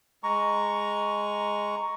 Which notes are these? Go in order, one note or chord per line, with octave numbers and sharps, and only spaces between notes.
G#3 A#5 C#6